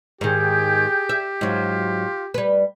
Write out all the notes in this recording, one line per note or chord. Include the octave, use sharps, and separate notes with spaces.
G#2 D#3 G4 G#4 G5 G6
E5
G#2 F#3 F4
G3 B4